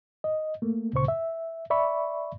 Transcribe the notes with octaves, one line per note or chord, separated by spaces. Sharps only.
D#5
A3 A#3
D2 A#2 C#3 C5 C#6
E5
D5 E5 B5 C#6